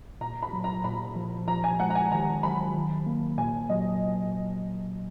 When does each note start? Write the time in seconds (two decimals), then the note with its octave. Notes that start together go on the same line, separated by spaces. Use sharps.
0.21 A#2 A#5
0.43 B5
0.53 F#3
0.64 A#5
0.84 A#2 B5
1.16 F3
1.48 F3 A#5
1.64 G#5
1.80 G#3 F#5
1.90 A#5
1.95 G#5
2.11 D#3 A#5
2.43 F#3 B5
2.74 D#3
3.06 A#3
3.38 A#2 G#5
3.69 F#3 D#5